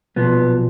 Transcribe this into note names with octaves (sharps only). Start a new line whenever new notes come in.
B1 A#2 F3 B3